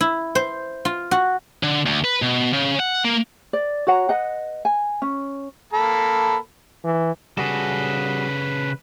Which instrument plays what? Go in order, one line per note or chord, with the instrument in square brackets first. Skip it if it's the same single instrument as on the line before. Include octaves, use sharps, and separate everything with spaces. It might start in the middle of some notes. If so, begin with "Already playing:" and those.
[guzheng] E4
C5
F4
F#4
[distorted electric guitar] D3
D2
B4
B2
C#3
F#5
A#3
[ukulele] D5
F#4 C#5 F#5 A#5
B4 D#5 F#5
G#5
C#4
[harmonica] A#3 A4 B5
[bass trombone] E3
[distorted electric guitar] C#3 A4 [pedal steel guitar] G3 F#4 G#4 [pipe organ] B4